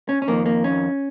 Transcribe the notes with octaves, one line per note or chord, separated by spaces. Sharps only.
C#4
C#4
F2 D#3 A#3
A#3
C#4